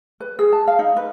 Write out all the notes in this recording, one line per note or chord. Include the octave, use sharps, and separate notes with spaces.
B4
G#4
A5
F5
D#4
B4